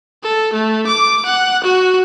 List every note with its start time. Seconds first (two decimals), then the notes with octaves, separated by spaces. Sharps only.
0.23 A4
0.53 A3
0.87 D6
1.26 F#5
1.64 F#4